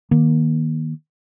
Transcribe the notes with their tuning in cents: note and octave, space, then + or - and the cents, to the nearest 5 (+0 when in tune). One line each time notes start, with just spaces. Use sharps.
D#3 +0 A#3 +20